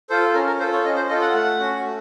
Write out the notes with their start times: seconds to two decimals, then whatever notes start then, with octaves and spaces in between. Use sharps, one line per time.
0.10 F4 A4 C5
0.34 C#4 A#4
0.47 A#4
0.59 F4 A4 C5
0.72 C#5
0.84 C#4 D#5
0.96 C5
1.09 F4 A4 D#5
1.21 F#5
1.34 A3 F#5
1.59 C#4 F#4
1.84 A3